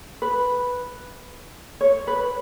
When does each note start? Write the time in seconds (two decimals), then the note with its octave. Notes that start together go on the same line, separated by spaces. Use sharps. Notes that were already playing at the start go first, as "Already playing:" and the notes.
0.22 B4
1.81 C#5
2.07 B4